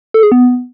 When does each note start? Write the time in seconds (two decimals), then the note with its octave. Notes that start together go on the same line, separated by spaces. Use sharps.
0.14 A4
0.23 G#4
0.32 B3